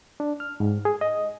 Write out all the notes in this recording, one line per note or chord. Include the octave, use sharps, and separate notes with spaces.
D4
F6
G#2
G#4
D#5